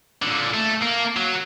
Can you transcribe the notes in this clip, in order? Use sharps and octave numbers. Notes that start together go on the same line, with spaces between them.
A#2 D3
A3
A#3
F#3